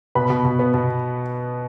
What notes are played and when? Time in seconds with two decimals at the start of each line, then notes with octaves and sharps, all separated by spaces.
0.15 B2 B4 B5
0.30 B2
0.45 B2
0.59 B3
0.74 B2